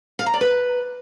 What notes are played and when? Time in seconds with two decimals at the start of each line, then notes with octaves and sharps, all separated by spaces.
0.19 F5
0.26 A#5
0.34 D5
0.41 B4